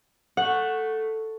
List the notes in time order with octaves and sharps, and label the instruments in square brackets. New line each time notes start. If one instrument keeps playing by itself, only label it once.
[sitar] A3 [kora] F#5